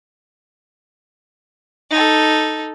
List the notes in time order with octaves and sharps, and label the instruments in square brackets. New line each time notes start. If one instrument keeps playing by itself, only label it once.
[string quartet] D#4 A4